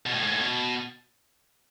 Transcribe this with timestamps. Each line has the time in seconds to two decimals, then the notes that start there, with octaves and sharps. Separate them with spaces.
0.06 B2
0.14 A2
0.23 G#2
0.32 A2
0.41 B2